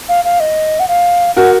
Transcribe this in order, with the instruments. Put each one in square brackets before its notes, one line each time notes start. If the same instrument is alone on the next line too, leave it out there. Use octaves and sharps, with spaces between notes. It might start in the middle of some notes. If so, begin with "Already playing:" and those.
[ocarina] F5
F5
D#5
F#5
F5
[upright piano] F#4 A#4 [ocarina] F#5